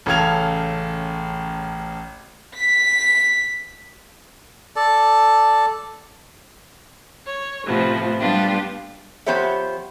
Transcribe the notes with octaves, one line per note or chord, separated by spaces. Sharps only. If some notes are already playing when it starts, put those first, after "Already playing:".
A1 C#3 A4 F5 G#6 F7
B6
A4 D5 A5
C#5
A2 C3 F3 B3
G3 B3 D4 F4 G4
F3 B3 G4 C5 C#5 E5